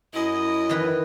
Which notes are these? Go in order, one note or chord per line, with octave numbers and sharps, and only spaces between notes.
F#2 E4 D#5
D#3 E3 B4